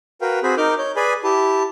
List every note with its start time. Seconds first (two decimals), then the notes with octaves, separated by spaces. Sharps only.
0.21 F#4 A#4 B4 F5 G5
0.43 C4 F#4 G#4 C5 B5
0.57 D#4 A#4 D6 F6 G6
0.78 C#5 G6
0.96 G#4 B4 D5 G#5 B5
1.24 E4 G4 A5